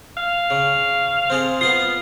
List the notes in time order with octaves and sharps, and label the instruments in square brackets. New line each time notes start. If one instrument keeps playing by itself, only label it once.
[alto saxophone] F5
[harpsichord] C#3
C4 G#4 A4
[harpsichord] B3 F5 D#6 [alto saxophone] F4